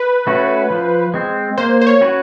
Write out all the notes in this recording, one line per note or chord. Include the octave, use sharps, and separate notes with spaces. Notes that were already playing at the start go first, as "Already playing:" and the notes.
Already playing: B4
A3 C#4 F#4
F3
G#3 C4
A#3 C5
C5
C#5
C#4 F#4 B4